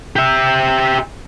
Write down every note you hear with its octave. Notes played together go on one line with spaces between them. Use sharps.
G4 E5